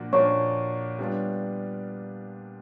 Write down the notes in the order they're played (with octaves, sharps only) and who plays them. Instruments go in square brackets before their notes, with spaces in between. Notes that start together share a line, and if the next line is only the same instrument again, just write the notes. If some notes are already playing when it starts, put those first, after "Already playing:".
Already playing: [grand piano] A#2 F3 A#3 D4 F#4
[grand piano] A#2 F3 A#3 D4 F#4 [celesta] C#5 C#6
[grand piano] G3 B3 D4 F4